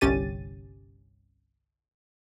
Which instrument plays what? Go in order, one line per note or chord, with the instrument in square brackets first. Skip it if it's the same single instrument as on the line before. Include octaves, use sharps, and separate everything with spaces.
[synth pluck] G1 C2 C#4 G4 A6 D#7